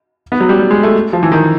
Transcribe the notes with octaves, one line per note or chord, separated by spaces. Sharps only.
B3
F#3
G3
G3
G#3
A3
F3
E3
D#3